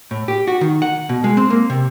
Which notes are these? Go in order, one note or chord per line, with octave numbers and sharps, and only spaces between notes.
A2
G4
F#4
D#3
F#5
B2
G#3
C4
A#3
C3